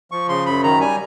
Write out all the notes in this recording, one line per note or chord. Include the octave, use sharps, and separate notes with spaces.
F3 C#6
C#3 C6
F#2 B5
D#3 A#5
G3 G#5